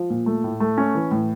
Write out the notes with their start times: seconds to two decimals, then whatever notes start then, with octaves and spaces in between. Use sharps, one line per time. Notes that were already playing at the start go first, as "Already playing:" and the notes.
Already playing: F3
0.10 A#2
0.26 A3
0.44 A2
0.60 A3
0.78 C#4
0.95 E3
1.11 A2